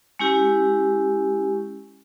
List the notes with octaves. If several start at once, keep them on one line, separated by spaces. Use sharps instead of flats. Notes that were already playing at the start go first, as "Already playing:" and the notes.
G#3 C#4 E4 G4